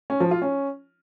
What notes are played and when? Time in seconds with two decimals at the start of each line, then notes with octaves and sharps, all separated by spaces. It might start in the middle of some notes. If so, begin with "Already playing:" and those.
0.10 C#4
0.20 F3
0.31 F4
0.42 C#4